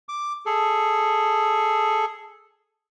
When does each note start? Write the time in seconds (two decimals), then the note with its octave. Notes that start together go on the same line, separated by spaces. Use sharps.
0.09 D6
0.46 G#4 A4